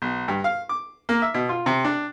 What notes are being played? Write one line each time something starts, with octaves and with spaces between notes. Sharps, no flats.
B1
G2
F5
D6
A#3
E5
B2
F4
C3
D4